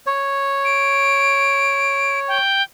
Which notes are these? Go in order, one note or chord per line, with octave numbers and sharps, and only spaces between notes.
C#5
D7
G5